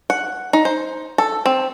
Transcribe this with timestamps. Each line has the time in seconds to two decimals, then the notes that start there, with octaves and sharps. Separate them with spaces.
0.10 F#5
0.53 D#4
0.65 C5
1.18 A4
1.46 C4